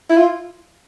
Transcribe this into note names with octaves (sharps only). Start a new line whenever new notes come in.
E4
F4